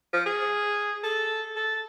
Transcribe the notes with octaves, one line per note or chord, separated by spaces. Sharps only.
F3
G#4
A4
A4